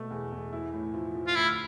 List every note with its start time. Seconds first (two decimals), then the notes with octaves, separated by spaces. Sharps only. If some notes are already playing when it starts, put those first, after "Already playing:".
Already playing: B2 A3
0.11 E2
0.32 E2
0.53 E4
0.73 A2
0.94 F3
1.15 F3
1.27 F4
1.35 D2 E4